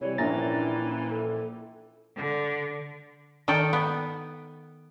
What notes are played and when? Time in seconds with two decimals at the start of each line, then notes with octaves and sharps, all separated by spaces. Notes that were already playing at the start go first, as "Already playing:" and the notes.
0.01 C3 E3 G3 C#5
0.18 A#1 A#2 C#4 D4 A#5 A6
1.10 A4
2.16 D3
3.48 D#3 A4 D5 G5
3.73 B3